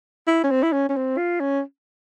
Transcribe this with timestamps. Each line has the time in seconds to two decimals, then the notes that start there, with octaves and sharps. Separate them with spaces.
0.27 E4
0.44 C#4
0.51 C4
0.63 E4
0.72 C#4
0.89 C#4
0.96 C4
1.17 F4
1.40 C#4